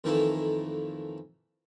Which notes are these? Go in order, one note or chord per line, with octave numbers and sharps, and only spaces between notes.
F2 D#3 E3 A3 A#3 E4